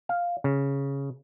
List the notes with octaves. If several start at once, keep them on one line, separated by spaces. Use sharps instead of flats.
F5
C#3